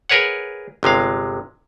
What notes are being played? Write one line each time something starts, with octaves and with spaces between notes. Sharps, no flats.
G#4 A#4 B4 C#5 F#5
G1 C3 G#3 F5